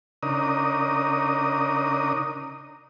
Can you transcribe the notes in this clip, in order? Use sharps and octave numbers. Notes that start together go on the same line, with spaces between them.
C#3 D4 D#4 A#4 D#6